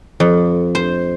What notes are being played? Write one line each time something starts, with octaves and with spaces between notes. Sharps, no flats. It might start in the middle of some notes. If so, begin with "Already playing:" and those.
F2
C5